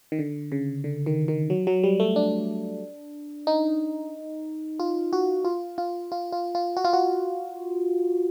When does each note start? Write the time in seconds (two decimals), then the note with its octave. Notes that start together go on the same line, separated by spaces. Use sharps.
0.12 D#3
0.19 D3
0.52 C#3
0.84 D3
1.06 D#3
1.28 D#3
1.50 F#3
1.67 F#3
1.84 G3
2.00 A3
2.16 D4
3.47 D#4
4.80 F4
5.13 F#4
5.45 F4
5.78 F4
6.12 F4
6.32 F4
6.55 F4
6.77 F#4
6.85 F4
6.93 F#4